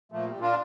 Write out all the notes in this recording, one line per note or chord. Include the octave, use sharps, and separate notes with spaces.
A#2 F3 A3
G3
A#2
D4 F4